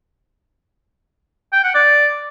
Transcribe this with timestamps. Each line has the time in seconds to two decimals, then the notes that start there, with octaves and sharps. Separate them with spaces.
1.53 G5
1.64 F#5
1.75 D5